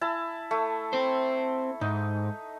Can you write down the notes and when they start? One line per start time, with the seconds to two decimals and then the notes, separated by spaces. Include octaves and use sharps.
0.01 E4 A5
0.51 A3
0.93 C4 C5
1.81 G#2 D#4